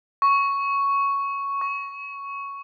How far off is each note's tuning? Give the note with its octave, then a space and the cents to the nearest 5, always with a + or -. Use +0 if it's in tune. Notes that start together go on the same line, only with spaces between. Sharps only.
C#6 +5
C#6 +5